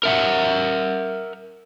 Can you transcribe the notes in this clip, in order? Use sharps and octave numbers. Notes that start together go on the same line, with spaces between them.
A#4 E5 F#5